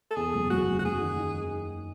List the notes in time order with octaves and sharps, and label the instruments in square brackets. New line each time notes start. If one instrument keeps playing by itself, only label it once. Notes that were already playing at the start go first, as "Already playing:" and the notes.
[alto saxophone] A4
[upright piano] E2 [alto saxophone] G#4
[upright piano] F#1
[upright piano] F#1 [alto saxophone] F#4
[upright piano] F#1
[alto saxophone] F#4
[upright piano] F#1 [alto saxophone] G#4
[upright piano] D#3
D#3